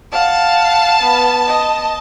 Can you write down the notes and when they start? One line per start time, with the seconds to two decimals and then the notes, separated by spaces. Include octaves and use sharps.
0.12 F5 F#5 A5
1.03 B3
1.47 D#5